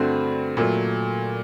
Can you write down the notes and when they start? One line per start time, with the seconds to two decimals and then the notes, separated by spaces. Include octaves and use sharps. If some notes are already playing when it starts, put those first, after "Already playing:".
Already playing: G2 D3 A3 C4 F#4
0.57 A#2 F#3 A3